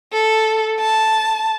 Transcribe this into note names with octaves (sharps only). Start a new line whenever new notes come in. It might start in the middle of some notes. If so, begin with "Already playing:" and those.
A4
A5